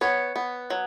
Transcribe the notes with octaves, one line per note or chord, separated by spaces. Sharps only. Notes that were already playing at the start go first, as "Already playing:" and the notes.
B3 C#5
B3
F#3